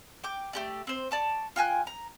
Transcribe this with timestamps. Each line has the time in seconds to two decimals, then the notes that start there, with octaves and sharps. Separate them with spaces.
0.24 G5 D6
0.53 A3 G4 D5
0.87 C4 C5
1.11 D5 A5 C#6
1.56 F4 G5 G#5 F#6
1.87 A#5